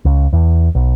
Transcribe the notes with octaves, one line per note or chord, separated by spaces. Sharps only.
C#2
E2
B1